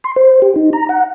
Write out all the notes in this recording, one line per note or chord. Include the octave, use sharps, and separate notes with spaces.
C6
C5
G4
D#4
A#5
F#5